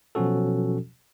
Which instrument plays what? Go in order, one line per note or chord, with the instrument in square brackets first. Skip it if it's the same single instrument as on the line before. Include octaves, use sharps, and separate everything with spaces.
[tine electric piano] B2 F3 F#3 C#4 F#4 A4